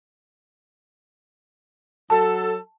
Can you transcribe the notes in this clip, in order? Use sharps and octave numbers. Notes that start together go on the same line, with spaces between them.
F#3 A4 A5